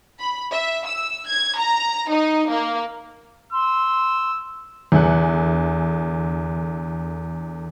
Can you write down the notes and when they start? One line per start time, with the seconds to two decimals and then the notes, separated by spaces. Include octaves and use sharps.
0.19 B5
0.52 E5
0.86 E6
1.27 G#6
1.58 A#5
2.10 D#4
2.50 A#3
3.53 C6 E6
4.92 E2 D3 E5 G#5 F#6 C#7